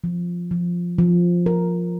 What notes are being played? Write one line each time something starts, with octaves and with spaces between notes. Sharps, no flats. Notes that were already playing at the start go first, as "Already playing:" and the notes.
F3
F3
F3
A#4